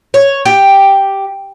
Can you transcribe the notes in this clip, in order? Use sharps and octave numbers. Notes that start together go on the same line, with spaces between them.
C#5
G4